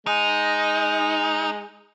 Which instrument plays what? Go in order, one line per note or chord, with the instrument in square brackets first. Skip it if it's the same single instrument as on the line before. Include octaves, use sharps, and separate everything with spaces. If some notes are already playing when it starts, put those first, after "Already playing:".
[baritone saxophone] G#3 [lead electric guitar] D#4